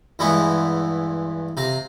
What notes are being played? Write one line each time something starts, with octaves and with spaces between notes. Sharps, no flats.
E2 G2 G#3 B3 E4 C#6
C3 F5 A#5